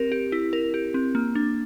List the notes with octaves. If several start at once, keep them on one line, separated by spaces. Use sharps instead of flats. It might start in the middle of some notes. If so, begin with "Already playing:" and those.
Already playing: C4 G4 A#4
G4
E4
A#4
G4
C4
A#3
D4